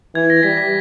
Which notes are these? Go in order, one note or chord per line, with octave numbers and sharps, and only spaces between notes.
E3 G#6
A#6
G3 B6
B6